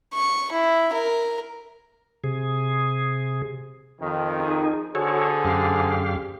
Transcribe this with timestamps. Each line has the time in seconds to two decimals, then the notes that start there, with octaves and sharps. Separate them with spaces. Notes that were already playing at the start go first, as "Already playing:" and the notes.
0.14 C#6
0.52 E4
0.93 A#4
2.24 C3 G#4
4.01 F2 D#3
4.40 D#4 G#4
4.95 D3 F#4 G#4 A4 C5 C#5
5.45 F#2 G4 F5